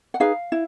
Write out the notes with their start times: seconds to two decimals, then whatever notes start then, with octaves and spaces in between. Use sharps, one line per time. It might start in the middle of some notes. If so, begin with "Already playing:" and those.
0.14 F#5
0.20 D#4 G#4 B4 F5
0.52 E4